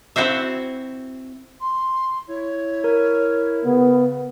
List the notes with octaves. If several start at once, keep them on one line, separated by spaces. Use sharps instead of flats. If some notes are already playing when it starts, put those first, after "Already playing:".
C4 E4 F#4 C5 E5
C6
E4 C#5
A#4
C#3 B3